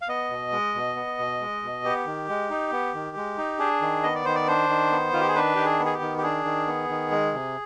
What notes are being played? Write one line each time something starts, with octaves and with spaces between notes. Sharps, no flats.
F5
B3 D#5
B2
G#3
B2
B3
B2
G#3
B2
B3 G4
D#3
G#3
D#4
B3
D#3
G#3
D#4
D4 G#4
D#3
B3 D#5
D5
D#3 C5
D5
D4 C5
D#3
B3
D#3 F4
G4
G#4
D4 B4
D#3 G4
G#4
B3
G#4
G4
D#3
G4
D4 G#4
D#3
B3
D#3
G#3
C3